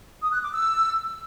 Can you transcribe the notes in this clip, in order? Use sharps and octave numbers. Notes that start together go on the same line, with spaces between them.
D#6
F#6
D6
E6